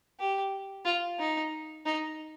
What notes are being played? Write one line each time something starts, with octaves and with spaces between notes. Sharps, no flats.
G4
F4
D#4
D#4